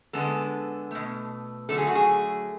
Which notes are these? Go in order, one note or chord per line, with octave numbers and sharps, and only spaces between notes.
D3 G#3 B3 A4
B2 A3
D3 F#3 A3 A4
G#4
F#4
G#4